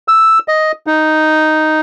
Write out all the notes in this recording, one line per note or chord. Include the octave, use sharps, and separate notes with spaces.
E6
D#5
D#4